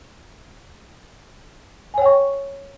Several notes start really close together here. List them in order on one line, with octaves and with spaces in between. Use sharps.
G#5 C#5 G5 C#6